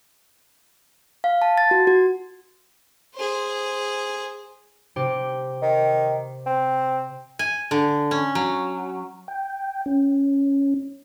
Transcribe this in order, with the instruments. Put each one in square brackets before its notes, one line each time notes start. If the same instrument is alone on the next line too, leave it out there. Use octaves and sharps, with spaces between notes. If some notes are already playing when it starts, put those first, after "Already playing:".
[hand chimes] F5
A5
A6
F#4
F#4
[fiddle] G#4 C5
[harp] C3 G4
[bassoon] D#3
C4
[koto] G#5
D3
C#4
F#3
[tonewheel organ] G5
C#4